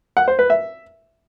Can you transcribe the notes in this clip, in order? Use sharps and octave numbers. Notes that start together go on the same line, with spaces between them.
F#5
C5
B4
E5